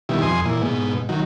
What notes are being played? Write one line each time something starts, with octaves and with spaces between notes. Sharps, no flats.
B2 D#3 G3 E4
F2 G#5 C6 D#6
A#2 E3
G#2 B2
D#3 F#3